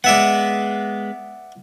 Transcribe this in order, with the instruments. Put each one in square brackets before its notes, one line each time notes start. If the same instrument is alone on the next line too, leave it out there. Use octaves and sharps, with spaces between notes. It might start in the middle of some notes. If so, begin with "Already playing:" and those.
[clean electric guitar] G#3 B3 [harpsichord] D5 E5 F#5